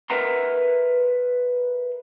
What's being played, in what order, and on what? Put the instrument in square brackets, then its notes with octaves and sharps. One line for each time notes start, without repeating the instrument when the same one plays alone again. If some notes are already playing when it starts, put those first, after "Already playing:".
[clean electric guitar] A#4 B4 E5 F#5 A#5 C6